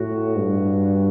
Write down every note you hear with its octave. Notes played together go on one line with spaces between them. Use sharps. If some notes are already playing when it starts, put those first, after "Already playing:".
Already playing: A2 F#4
G2